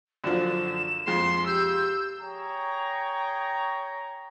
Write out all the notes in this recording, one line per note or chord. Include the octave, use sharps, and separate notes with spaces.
F#2 D3 F3 E7
F2 G#3 C6
G4 E6 G6
G#4 C#5 G5 A#5 C#6